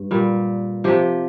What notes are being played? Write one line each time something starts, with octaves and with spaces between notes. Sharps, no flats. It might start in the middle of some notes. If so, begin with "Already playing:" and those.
Already playing: G2
A#2 G3
C3 F3 G4